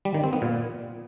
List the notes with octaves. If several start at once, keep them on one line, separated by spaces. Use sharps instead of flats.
G3
D#3
C4
B3
A#2